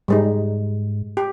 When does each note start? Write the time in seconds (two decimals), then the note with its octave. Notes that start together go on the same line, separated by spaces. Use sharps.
0.08 G#2 G3 G#3 D#4
1.17 G4